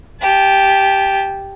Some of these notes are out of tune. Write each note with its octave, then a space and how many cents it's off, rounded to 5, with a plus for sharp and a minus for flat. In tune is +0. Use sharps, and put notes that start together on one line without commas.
G4 +0 A5 -30